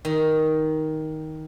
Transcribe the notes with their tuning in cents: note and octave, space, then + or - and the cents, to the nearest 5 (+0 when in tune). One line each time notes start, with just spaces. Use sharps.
D#3 +10